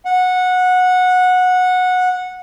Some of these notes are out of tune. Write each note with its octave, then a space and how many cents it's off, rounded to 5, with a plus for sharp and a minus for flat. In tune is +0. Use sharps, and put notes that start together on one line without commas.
F#5 -15